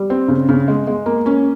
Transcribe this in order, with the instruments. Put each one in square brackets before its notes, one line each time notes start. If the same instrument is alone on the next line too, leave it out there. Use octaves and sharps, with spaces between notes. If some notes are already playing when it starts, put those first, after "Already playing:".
Already playing: [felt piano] G3
C4
C#3
C#3
G#3
G#3
A#3
C#4